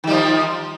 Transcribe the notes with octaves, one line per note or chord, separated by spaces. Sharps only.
D#3 F3 G3